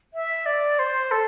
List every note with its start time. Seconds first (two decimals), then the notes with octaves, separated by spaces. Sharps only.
0.14 E5
0.46 D5
0.79 C5
1.11 A4